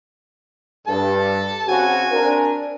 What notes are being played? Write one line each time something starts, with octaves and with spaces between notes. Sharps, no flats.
G2 A4 A5
C#3 C4 F#4 G#5
C4 D4 A#4